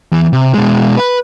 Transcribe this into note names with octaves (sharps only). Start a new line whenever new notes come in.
E3 B3
C3
B2 G#3
B4